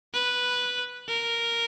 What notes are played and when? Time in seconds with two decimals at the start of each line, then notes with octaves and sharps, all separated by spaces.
0.13 B4
1.08 A#4